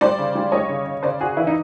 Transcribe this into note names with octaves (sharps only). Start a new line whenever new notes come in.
G3 C5 D5
C#3
G3
G3 C#5 D#5
C#3
C#3
C#3 C5 D5
C#3 F#4 G#4
E3 E4
D#4